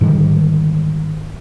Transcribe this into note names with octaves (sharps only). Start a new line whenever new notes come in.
G#2 D3 D#3 G3